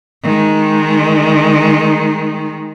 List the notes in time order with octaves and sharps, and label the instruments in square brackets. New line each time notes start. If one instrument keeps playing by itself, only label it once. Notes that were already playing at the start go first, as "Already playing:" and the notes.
[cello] D#3 G#3